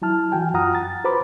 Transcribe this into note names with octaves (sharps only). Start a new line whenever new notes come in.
F#3 E4 A5 F6
E3 F#4 G5 G#5
F#2 F4 F#5 A#5 D#6 F6
A6
F#4 B4 C5 A#5 B5 D6